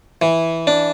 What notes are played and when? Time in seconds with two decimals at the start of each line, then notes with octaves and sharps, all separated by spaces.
0.22 E3
0.67 D4